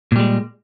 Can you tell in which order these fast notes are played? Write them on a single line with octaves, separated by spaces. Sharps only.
A#2 G3 G#3